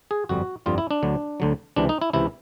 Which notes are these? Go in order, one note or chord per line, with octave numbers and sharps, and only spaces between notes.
G#4
G1 F2 D3 G3 F#4
G1 F2 D3 G3 F4
E4
D4
D2 D3 F#3
D2 D3 F#3
C#2 C3 E3 D4
D#4
E4
C#2 C3 E3 E4